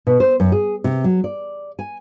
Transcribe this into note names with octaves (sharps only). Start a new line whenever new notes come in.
B2
C5
F#2
G#4
C3
F#3
D5
G#5